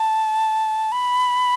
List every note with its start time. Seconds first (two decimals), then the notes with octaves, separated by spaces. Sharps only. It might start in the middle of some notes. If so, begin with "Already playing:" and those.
Already playing: A5
0.92 B5